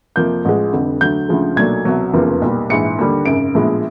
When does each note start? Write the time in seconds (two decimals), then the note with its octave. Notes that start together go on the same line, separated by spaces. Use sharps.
0.16 F2 C3 F3 A#3 G6
0.45 A1 A2 F3 G#3
0.73 F1 F2 D3 G3
1.01 D2 D3 F#3 G6
1.29 D2 C#3 F3 G#3
1.56 B1 A#2 F#3 A3 D4 G#6
1.85 C2 B2 F#3
2.13 F1 E2 C#3 F3 A#3
2.42 B1 A#2 G3
2.69 A#1 G#2 E3 C#7
2.99 D#2 D3 G3
3.25 G#1 F#2 C#3 D7
3.55 A#1 A2 F3 G#3 B3